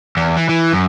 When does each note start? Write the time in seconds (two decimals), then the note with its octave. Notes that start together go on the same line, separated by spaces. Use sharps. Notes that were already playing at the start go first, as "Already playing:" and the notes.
0.17 E2
0.37 E3
0.49 E3
0.73 F#2